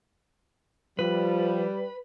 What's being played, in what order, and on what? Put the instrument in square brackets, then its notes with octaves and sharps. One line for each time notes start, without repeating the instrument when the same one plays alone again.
[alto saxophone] F3 [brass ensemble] G3 [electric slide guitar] B4